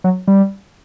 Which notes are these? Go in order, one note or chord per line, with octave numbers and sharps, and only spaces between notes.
F#3
G3